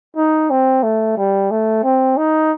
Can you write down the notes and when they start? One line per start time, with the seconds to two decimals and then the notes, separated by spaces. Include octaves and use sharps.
0.16 D#4
0.50 C4
0.83 A3
1.17 G3
1.51 A3
1.84 C4
2.17 D#4